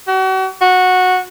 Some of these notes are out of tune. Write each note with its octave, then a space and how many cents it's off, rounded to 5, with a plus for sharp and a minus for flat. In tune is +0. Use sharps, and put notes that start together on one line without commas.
F#4 +40
F#4 -10